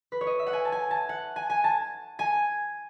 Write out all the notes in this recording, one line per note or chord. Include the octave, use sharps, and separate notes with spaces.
B4
C#5
D#5
E5
F#5
G#5
A5
G#5
A5
F#5
G#5
G#5
A5
G#5